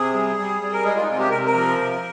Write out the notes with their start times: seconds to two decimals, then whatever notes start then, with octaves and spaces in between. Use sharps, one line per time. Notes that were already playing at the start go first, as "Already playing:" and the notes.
Already playing: C3 G#4
0.14 G3
0.37 G3
0.61 G3
0.73 A#4
0.84 G#3 G#4
0.96 F4
1.03 D#4
1.07 C3 F4
1.19 G4
1.31 C3 A#4
1.45 A#4
1.54 F3
1.78 C3